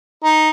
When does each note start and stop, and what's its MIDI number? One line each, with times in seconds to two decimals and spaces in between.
0.24 0.50 63